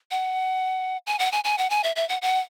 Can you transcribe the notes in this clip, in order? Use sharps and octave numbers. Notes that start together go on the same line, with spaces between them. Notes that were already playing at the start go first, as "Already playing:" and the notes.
F#5
G#5
F#5
G#5
G#5
F#5
G#5
E5
E5
F#5
F#5